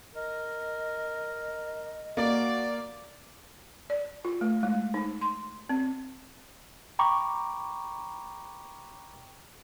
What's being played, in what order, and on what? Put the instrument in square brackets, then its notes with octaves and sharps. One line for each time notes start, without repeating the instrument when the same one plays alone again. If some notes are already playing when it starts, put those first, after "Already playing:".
[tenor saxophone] A#4 [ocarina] D#5
[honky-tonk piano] A#3 [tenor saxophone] F#4 [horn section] D5
[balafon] D5
F4
A3
G#3
D#4
C6
C4
[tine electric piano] G5 A#5 B5 C#6 D6